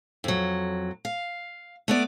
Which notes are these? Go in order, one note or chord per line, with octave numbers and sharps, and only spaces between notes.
F2 F#3
F5
A3 B3 D5